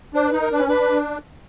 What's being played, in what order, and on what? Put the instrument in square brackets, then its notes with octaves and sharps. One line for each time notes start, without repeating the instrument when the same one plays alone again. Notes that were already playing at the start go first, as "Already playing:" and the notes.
[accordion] D4 [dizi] C5
[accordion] D#4 [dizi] B4
[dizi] A#4
[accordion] D4 [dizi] B4
[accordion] C#4
[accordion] D4 [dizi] B4